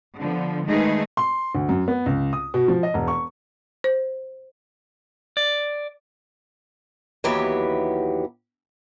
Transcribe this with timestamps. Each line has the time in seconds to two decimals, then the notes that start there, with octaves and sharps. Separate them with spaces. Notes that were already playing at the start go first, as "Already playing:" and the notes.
0.18 D3 F3 B3
0.66 D#3 G#3 A3 D#4 G#4 B4
1.17 C6
1.55 D2
1.69 F#2
1.88 B3
2.06 C#2
2.33 D#6
2.54 B2
2.68 F3
2.83 D#5
2.94 E1
3.08 C#6
3.84 C5
5.37 D5
7.24 D#2 E3 F#3 B3 G4 E5